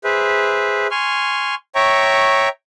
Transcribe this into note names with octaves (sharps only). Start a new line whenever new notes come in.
G#4 B4 C5 E5
G#5 C6 C#6 F6
C#5 E5 G5 A#5 C#6